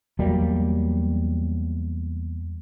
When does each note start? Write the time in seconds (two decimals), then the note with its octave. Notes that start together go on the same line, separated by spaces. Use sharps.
0.19 E2 F#3 G3 A#3